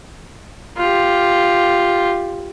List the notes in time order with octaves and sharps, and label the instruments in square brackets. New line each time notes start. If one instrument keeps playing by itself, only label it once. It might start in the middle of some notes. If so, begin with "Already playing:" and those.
[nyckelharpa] F4 G4